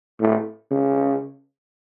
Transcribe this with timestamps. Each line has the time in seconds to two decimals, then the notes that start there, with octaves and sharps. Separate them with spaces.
0.20 A2
0.71 C#3